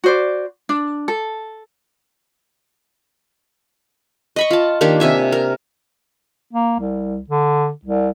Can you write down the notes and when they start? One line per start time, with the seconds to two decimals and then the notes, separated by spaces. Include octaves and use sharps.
0.04 F#4 C5 D5
0.69 D4
1.08 A4
4.36 D#5 B5 C#6
4.51 F4 A5
4.81 D#3 A#3 D4 G4
5.00 C3 E5 G#5
5.32 A#4
6.53 A#3
6.80 C2
7.30 D3
7.85 C2